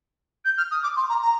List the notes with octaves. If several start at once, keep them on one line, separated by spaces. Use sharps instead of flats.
G6
F6
D#6
D6
C6
A#5
A#5